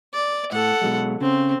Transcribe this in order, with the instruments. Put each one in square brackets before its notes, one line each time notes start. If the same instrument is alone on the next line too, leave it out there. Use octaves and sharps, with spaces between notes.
[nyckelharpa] D5
[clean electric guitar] A2 [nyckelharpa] A4 F#5
[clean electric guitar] B2 F#3 G#3
[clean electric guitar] C#3 [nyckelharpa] C4